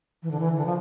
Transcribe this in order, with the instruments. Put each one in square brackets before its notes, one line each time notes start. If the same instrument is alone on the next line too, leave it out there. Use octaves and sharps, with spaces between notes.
[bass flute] E3
D3
E3
D3
F3